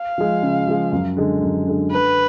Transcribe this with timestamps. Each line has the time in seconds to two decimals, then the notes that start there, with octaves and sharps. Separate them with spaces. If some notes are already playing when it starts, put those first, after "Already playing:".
Already playing: F5
0.18 F3 G#3
0.43 C#3
0.67 F3 G#3
0.92 F#2
1.17 D3 G#3
1.42 F#2
1.67 D3 G#3
1.91 D3 B4